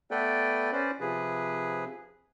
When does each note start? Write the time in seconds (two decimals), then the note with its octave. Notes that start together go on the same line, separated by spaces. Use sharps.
0.11 A3 B3 A4 B4 D5 G5
0.72 C#4 B4 C5 D5
1.00 C3 F3 G#4 B4